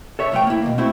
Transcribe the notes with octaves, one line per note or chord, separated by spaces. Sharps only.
A4 C#5 E5
C2 F2 F3 A3 C#5 G5
A#3 E4
B2 D#3 A#3
A3 C4 E4 F#4